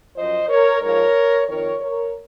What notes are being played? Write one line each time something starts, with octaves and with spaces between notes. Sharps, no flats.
F#2 F3 C5 D#5
A#4 C#5
G#2 F3 A#4 C#5
F2 D#3 A#4 C#5
A#4 C#5